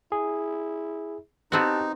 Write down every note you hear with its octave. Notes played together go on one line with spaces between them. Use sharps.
E4 G#4
B3 C4 D#4 F#4 G4 A5 F#6